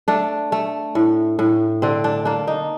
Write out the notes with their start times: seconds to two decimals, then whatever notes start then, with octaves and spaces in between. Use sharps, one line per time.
0.08 A3 D4
0.52 A3
0.95 A2
1.39 A2
1.82 D3 C4
2.04 D4
2.25 A#3 D4
2.47 D#4